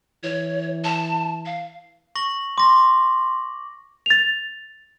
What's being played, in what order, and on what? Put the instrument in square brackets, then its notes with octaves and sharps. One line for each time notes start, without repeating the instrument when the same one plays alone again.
[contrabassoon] E3 [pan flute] C#5
[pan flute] A5
F5
[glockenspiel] C#6 A#6 F#7
[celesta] C6 [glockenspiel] D6 A#6
[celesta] A6 F7